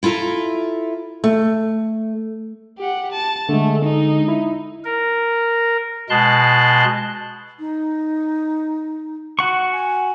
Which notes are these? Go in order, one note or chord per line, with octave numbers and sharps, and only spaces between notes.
E4 F4 A4 E5 A#5
A3
G4 F#5
A5
D3 G#3 A3
D#4
E4
A#4
B2 G#3 A5 C6 F#6
D#4
F#4 F#5 C#6
G#5